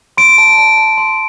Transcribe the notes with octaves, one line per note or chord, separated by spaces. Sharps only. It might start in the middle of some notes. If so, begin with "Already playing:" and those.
C6 D7
A5
A5
A5
C6